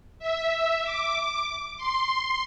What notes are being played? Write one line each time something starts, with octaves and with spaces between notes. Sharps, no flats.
E5
D6
C6